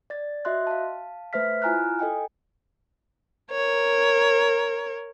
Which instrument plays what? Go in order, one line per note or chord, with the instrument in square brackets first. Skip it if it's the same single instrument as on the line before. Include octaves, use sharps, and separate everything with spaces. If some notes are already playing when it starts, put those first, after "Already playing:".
[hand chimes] D5 A6
F#4 D#5 E5 C6 F#6
F5 A5
A3 B4 C5 E5 F6 B6
E4 F4 G#5 A#5 F6 F#6
A4 D#5 G5 G#5
[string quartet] A#4 C#5